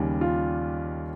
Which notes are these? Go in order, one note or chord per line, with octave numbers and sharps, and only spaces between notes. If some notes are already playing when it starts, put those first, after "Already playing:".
Already playing: D#2 C#3 G3 C#4
F4